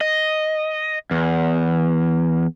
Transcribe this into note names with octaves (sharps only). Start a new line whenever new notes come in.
D#5
E2